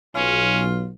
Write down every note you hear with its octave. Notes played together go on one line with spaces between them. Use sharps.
B1 C#4 F4